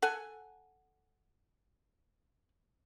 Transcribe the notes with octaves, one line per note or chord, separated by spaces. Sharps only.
A4 F#5 G#5